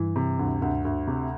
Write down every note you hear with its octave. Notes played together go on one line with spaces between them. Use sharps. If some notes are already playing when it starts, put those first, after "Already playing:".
Already playing: G2 E3
C3
D2
D2
D2
C3